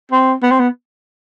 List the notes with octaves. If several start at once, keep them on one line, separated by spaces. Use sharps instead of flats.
C4
B3
C4
B3